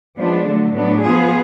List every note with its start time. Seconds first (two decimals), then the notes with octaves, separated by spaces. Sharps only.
0.18 F3 G#3 B3 D4
0.47 D3 F#3 A3
0.75 A2 F#3 B3 D4
1.02 F3 B3 F4 G#4